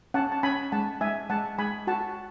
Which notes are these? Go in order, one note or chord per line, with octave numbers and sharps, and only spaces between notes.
C#4 F#5 A5
A5
C#4 G#5 B5
G#3 F#5 A5
G#3 E5 G#5
G#3 F#5 A5
G#3 G#5 B5
F#4 F#5 A5